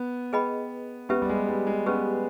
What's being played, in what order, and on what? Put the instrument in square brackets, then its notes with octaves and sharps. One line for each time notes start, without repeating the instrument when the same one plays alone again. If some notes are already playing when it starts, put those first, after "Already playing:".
Already playing: [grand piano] B3
[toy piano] G#4 B4 D#5 G5 B5
[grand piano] B3 [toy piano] C#4 G4 B4 E5
[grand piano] G3
G#3
G3
G#3
[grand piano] B3 [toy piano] C#4 G4 B4